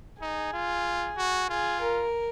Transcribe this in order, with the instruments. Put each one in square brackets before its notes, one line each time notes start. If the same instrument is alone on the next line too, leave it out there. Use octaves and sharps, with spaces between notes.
[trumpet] D#4 [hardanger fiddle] G#4
[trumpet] F4
F#4
[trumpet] F4 [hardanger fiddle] G#4
[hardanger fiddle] A#4